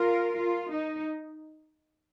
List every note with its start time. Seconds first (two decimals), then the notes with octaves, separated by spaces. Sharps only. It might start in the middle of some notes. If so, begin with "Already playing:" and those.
Already playing: F4 A#4
0.37 F4
0.72 D#4